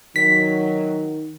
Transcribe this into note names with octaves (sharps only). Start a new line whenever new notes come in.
D#3 F#3 B6